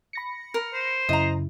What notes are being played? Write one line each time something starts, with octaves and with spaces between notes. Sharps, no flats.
B5 A#6 C#7
A#4
C5
F#2 C#3 E4 D#5 A#5